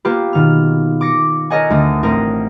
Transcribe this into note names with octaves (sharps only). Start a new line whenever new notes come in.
A#3 B3 F4 G4 B4
B2 D#3 F6
D6 A#6 C#7 D7
A4 A#4 C#5 D#5 F#5 G#5
D2 D3 D#6
A1 C4 A#4 D#6